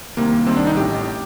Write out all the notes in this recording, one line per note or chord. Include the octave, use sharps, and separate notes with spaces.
C2 C3 D#3 A#3
C2 C3 D#3 C4
D4
D#4
A1 A2 G4